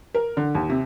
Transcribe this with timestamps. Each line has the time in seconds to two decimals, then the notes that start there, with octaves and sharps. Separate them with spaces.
0.14 A#4
0.37 D3
0.55 D#2
0.70 C3